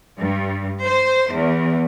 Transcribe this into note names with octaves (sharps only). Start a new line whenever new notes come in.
G2
C5
E2